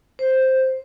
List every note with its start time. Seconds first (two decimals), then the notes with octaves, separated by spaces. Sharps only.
0.19 C5